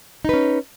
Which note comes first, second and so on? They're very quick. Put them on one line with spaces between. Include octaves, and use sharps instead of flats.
D#4 B4 C#4